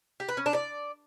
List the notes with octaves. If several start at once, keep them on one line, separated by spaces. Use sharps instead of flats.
G4
B4
C#4
D4
D5